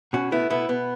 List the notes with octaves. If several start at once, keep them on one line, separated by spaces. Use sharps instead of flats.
B2 C#4 F#4
A3 B3 E4
B2 B3 E4
B2 B3